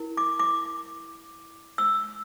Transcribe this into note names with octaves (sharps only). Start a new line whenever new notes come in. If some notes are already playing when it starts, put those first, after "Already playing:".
Already playing: E4 A#4
D6
D6
E6